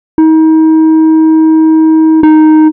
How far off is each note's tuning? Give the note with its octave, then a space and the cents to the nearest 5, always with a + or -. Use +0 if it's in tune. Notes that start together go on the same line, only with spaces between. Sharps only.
D#4 +35
D#4 +0